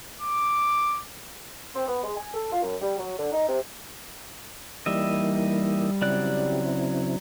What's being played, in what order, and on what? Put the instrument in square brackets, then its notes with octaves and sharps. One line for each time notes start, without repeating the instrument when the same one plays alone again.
[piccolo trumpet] D6
[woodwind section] C4
B3
G#3
G#5
A4
F4
F#2
G3
F#3
D3
D#4
C3
[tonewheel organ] E3 A#3 D#4 [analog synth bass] G3 [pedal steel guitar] D#5 E5
[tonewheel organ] C#3 C4 E4 [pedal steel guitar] F#3 D5 F#6